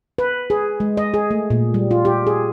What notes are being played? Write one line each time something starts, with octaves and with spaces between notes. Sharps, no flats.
B4
G#4
G#3
D#5
G#4
A3
A#2
G3
F4
G4
G#4